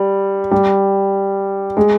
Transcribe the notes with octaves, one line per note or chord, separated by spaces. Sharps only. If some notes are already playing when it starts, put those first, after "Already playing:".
Already playing: G3
G3
G#3